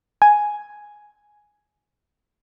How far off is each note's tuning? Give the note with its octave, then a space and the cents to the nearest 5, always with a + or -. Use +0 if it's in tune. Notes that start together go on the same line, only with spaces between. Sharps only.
G#5 +5